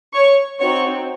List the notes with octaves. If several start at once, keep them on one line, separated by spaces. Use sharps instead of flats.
C#5 C#6
C4 D#4 F#4 C#5 C#6